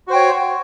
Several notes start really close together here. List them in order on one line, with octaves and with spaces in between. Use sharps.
F#4 C5 G5 C#5